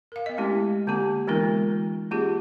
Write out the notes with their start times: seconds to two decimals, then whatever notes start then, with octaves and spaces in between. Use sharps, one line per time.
0.12 A#4 F5
0.26 B3 D#5
0.38 G#3 A3 C4 C#4 E4 G4
0.87 D3 A#3 C4 G4 A#5
1.27 E3 G#3 B3 D#4 F4 A#4
2.11 A#3 C#4 F4 G4 G#4